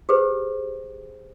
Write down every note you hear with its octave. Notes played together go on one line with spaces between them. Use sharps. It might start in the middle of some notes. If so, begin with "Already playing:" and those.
G4 G#4 B4 C5